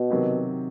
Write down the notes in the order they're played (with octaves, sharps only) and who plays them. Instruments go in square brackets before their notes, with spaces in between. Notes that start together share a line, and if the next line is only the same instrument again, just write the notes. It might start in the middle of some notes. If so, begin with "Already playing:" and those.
Already playing: [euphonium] B2
[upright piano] C3 D#3 F#3